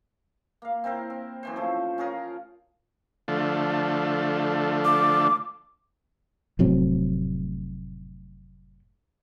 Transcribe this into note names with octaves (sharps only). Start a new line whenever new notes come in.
A#3 F5
C4 E4 A#4 C5
C4
F#2 E3 C5
F3 A3
C#4 F4 G#4 A#4
D3 F3 A3
D6
F1 A2 F#3 C4